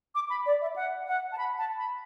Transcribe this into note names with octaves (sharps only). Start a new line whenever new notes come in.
D6
B5
D5
E5
F#5
F#5
A5
B5
A5
B5